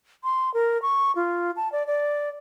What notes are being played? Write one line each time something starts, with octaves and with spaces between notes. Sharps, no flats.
C6
A#4
C#6
F4
A5
D5
D5